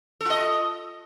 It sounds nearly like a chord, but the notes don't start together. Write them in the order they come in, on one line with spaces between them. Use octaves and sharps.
A4 F4 D#5